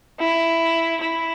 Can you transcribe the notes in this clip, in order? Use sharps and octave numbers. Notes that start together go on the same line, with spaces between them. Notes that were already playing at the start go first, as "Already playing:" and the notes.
E4
E4